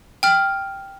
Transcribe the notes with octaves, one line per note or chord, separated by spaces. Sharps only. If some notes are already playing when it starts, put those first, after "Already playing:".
G5 F6